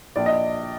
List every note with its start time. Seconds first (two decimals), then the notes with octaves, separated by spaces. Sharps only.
0.16 A#1 D5
0.26 D#5